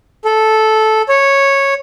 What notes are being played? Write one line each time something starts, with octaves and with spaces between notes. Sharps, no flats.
A4
C#5